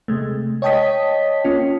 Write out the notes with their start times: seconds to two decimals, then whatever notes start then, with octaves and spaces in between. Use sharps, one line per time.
0.08 C3 G#3 A3
0.62 C#5 D#5 G5 A5 D#6 B6
1.44 A#3 C#4 F4